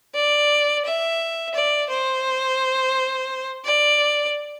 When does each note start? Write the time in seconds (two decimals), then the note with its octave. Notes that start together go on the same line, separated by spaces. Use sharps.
0.14 D5
0.85 E5
1.54 D5
1.89 C5
3.64 D5